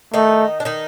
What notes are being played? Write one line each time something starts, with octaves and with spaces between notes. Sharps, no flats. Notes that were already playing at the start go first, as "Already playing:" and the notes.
D#3 A3 D#4
D4
D#3 D#4